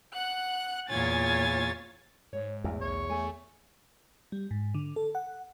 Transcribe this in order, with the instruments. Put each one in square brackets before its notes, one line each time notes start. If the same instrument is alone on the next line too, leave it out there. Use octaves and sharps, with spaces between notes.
[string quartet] F#5 F#6
E2 A#2 F4 C#5 G#5 A6
[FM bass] G#2 [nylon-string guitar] C#5
[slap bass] E2 [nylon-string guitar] A2
[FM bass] B1 [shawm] C#5
[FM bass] A3 [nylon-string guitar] G#5
[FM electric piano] G3
G#2
D3
A4
F#5